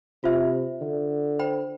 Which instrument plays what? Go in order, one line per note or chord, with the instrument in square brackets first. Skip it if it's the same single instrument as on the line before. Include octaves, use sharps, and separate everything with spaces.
[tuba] C3 [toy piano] F4 C5 E5
[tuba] D3
[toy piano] C5 G5 B5